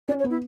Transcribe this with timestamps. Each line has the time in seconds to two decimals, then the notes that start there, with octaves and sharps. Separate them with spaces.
0.08 C#4 D5
0.19 C#5
0.24 B3
0.30 E4